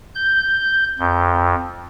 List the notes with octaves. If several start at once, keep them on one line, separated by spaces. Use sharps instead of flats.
G6
F2